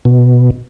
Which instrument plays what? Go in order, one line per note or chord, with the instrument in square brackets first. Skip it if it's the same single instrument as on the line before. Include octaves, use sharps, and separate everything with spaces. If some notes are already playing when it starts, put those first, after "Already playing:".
[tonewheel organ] B2